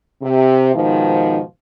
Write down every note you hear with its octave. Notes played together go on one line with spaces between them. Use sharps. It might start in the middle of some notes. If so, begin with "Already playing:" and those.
C3
G#2 B2 D#3 F3